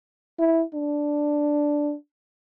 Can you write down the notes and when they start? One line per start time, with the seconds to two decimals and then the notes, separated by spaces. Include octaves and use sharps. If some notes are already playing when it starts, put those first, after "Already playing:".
0.39 E4
0.74 D4